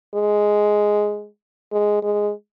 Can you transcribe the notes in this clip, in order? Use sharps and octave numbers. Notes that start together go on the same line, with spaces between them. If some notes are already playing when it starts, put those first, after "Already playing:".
G#3
G#3
G#3